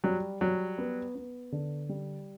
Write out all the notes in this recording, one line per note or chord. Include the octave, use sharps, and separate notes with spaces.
F#3 G3
F#3 G3
B3
B3
D3
G3